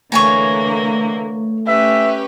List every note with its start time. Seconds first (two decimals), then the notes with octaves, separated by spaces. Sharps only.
0.12 D3 E3 A3 A#3 C#5 G#5 A#5
1.67 C#4 G4 B4 E5